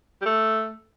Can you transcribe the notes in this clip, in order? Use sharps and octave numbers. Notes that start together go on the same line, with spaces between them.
G3
A3